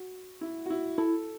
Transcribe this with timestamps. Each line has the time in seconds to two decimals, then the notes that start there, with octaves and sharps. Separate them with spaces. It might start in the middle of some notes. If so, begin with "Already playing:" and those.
Already playing: F#4
0.41 E4
0.66 F#4
0.70 E4
0.98 E4 A4